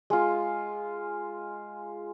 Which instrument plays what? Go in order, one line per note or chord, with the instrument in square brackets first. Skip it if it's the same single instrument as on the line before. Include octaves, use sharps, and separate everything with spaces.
[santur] G#3 F4